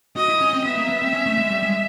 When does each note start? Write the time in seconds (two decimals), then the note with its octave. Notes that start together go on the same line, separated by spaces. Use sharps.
0.16 F#4 D#5
0.29 E4
0.41 C#4
0.53 C4
0.65 B3 E5
0.78 A#3
0.90 B3
1.02 C4
1.14 C#4
1.26 A3
1.38 G#3
1.51 G3
1.63 G#3